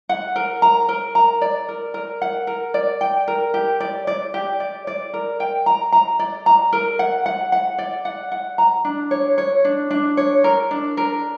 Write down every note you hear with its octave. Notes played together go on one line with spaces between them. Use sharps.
F#5
A#4
A#5
A#4
A#5
D5
A#4
A#4
F#5
A#4
D5
G5
A#4
G4
D5
D5
G4
D5
D5
A#4
G5
A#5
A#5
D5
A#5
A#4
F#5
F#5
F#5
D5
F#5
F#5
A#5
D4
C#5
C#5
D4
D4
C#5
A#4
D4
A#4